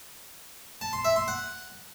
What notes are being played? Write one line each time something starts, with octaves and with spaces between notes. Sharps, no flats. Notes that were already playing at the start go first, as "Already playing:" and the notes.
A5
C6
E5
C6
F#5